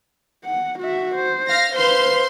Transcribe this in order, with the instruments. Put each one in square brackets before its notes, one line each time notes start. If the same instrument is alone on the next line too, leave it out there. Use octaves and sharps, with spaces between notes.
[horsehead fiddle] F#5
F#4 E5
C5
[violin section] F5 A#6
[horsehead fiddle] B4 F5 [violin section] C5 C6